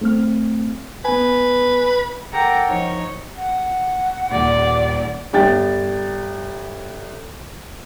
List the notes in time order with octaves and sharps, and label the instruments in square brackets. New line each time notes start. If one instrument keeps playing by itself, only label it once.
[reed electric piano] A3 C4 F6
[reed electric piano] B3 G#5 [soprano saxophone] B4
[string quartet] A4 A#4 F#5 G5 A#5 D6
F3 D#4 C#5
[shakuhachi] F#5
[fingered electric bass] D#2 A#2 [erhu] D5
[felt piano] G1 G3 G5 A6